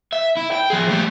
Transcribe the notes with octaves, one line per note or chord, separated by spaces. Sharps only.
E5
E4
G5
F3 G#4
G3 A3